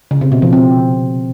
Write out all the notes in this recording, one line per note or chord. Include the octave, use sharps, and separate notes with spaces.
C#3
C3
B2
F3
C4